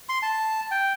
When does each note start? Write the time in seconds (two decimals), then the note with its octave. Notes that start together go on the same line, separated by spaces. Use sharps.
0.09 C6
0.22 A5
0.71 G5